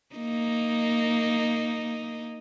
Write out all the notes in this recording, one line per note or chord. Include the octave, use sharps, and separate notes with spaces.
A#3 D#4